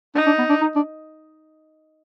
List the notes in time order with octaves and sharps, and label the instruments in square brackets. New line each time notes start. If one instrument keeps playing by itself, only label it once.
[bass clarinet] D4 [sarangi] D#4
[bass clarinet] D4
B3
D4
D#4
D4